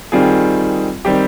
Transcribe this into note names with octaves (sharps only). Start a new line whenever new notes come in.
D#3 G3 C4 F4 G#4
D#3 G3 C4 G4